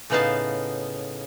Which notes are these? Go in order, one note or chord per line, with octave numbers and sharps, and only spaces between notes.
A2 C#3 B3 D#4 F5 A5